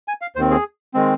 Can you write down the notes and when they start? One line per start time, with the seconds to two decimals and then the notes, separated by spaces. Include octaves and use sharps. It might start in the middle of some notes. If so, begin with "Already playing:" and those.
0.08 G#5
0.22 F5
0.36 D#2 D#3 C4 C5
0.51 G#4
0.94 D#3 G#3 C4